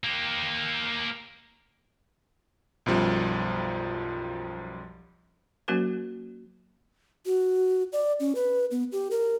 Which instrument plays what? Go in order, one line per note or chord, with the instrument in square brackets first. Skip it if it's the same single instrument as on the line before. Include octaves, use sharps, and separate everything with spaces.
[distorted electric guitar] A#3 G4
[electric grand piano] B1 F#2 F3 G3
[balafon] F#3 A#3 C#4 F#4 A#4 C5
[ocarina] F#4
D5
C#4
B4
B3
G4
A#4